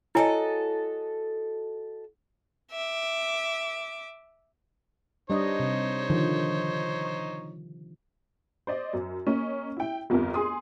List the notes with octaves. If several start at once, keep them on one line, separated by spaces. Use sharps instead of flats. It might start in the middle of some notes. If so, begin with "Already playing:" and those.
E4 F#4 A4 C#5 D#5 G#5
E5 D6
G3 D4 D#4 C5 C#5 D#5
C3
D3 D#3 F3
C5 D5 D#5
F#2
A#3 C#4 D#5
E4 G5
G1 F2 F3 G4 A#4
G#4 C6 D#6